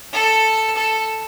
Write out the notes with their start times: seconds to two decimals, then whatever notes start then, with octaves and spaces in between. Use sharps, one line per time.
0.13 A4
0.76 A4